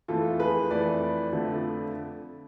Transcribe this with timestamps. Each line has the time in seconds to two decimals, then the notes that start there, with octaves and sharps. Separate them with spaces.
0.08 F2 E3 A3 F4 A4
0.39 G#4 B4
0.70 F2 E3 A3 B4 D5
1.32 F2 D3 F3 A3